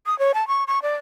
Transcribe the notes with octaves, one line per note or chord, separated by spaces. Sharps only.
D#6
C#5
A5
C#6
C#6
D5